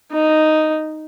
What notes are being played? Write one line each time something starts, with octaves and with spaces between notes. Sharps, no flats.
D#4